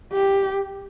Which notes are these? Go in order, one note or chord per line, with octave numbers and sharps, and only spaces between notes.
G4